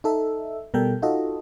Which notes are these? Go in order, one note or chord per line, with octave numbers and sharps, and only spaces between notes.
D#4 A4 E5
B2 G3 A4 A#4 G5
D#4 F4 F#4 A4 D#5